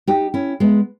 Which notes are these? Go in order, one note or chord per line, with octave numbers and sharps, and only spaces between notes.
D#4 G4
C#4 E4
G#3 B3